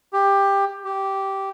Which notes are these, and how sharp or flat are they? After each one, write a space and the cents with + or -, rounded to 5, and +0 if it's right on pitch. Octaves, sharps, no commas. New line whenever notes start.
G4 +15
G4 -10